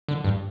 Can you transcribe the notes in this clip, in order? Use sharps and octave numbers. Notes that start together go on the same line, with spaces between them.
D3
G2